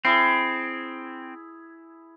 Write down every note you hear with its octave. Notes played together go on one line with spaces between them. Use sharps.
C4 E4 G#4